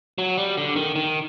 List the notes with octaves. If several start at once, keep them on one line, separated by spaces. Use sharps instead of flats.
F#3
G3
D3
D#3
D#3